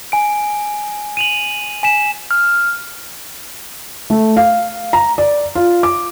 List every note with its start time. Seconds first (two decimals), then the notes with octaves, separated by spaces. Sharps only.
0.12 G#5 D7
1.17 D#7 F7 F#7
1.83 G#5 B6 E7
2.31 F6
4.10 A3
4.37 F5
4.93 A#5
5.18 D5
5.55 F4
5.83 D6